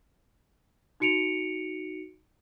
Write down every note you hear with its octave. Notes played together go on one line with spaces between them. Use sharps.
D#4 F#4 C#7 D7 F7